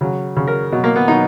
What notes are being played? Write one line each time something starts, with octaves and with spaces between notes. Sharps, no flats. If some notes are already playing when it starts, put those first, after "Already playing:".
C#3 F#3
C#3 F#3
A#4
B2 F#3
A#3
B3
B2 F#3 D#4